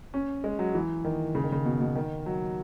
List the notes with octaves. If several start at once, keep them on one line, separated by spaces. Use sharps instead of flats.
C#4
G#3
F#3
E3
D#3
C#3
D#3
C#3
B2
B2
D#3
F#3